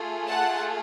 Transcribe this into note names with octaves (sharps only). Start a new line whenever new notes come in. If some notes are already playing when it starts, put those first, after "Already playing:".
Already playing: A3 F4 G#4
F#5 A5